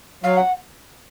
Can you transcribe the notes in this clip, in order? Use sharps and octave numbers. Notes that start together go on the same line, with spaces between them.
F#3 F5
F#5